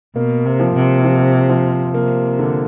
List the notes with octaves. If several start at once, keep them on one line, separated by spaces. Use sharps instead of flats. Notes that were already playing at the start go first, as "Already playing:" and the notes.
B2 A#3
C3
F3
C3
F3
F3
C3 A#3
D3